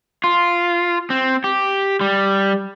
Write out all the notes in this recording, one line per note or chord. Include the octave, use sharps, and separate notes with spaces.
F4
C4
G4
G3